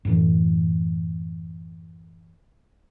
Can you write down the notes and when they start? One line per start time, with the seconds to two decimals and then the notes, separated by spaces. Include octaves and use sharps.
0.05 F#2 A2 E3